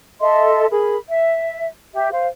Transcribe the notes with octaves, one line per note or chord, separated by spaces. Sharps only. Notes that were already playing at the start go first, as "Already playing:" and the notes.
A4 D#5 E5 C6
G#4 A#4 B5
E5
G4 E5
C5 F5